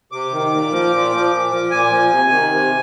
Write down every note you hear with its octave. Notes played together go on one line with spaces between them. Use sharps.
C3 D6
D#3
A#2
F3
A#2
F3
A#2
F3
A#2 G#5
F3
C3
D#3
C3